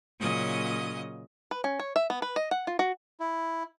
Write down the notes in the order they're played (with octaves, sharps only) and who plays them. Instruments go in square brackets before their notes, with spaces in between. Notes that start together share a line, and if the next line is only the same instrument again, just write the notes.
[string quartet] A#2 C#3 F#3 C#4 D#5 D#6
[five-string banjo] B4
C#4
C#5
E5
B3
B4
D#5
F#5
F4
F#4
[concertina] E4